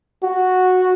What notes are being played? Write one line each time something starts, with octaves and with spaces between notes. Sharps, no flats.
F#4